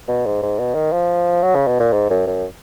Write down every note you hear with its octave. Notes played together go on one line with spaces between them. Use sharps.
B2
G#2
G#2
B2
D#3
F3
F#3
C#3
B2
A#2
G#2
F#2
F#2